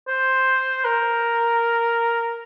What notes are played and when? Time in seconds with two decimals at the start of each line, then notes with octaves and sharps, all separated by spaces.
0.08 C5
0.85 A#4